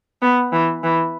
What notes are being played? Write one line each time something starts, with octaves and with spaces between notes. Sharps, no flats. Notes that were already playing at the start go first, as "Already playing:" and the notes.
B3
E3
E3